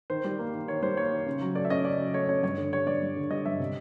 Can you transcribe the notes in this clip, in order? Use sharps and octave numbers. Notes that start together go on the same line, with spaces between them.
D#3 C5
G3
A#3
D#3
D#3 C#5
G3 C5
A#3 C#5
D#3
C#3
F#3
A3 D5
E5
C#4 D#5
C#3 D5
F#3
A3 C#5
C#4 C#5
G2 C#5
D3
G3 C#5
G2 D5
G2
D3
G3 D#5
G2 E5
C3